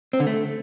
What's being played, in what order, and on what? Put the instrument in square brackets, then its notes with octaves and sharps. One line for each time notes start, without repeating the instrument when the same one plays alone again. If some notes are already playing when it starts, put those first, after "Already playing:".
[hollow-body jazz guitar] C4
D3
A3